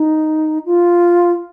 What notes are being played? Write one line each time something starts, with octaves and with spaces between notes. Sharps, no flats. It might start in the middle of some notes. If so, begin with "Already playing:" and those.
Already playing: D#4
F4